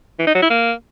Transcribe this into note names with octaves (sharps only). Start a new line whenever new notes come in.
E3
D#4
F#3
E4
A#3